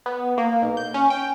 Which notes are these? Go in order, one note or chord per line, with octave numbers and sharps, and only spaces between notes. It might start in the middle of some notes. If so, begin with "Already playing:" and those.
B3
A#3
B1
G6
C#4
G5